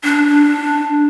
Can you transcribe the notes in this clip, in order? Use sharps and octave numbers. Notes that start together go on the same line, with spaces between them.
D4